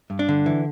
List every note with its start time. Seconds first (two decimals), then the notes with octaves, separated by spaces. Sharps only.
0.10 G2
0.19 D4
0.29 D3
0.46 E3